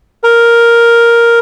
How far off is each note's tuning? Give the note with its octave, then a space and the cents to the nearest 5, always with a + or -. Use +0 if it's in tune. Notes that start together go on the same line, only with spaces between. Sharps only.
A#4 +5